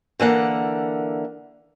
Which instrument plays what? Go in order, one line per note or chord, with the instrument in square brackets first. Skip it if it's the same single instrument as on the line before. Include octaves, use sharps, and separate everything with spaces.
[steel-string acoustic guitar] D3 E3 A#3 F#5